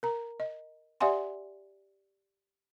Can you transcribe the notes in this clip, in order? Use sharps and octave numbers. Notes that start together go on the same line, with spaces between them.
A#4 A#5
D#5
G4 D5 E5 F#5 G#5 C6